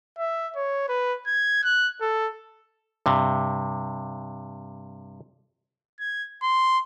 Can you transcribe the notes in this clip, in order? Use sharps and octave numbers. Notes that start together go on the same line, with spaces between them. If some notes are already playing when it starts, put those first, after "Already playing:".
E5
C#5
B4
G#6
F#6
A4
G2 C3
G#6
C6